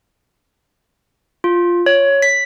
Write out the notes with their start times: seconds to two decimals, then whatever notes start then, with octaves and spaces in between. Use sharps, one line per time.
1.44 F4
1.86 C#5
2.22 B6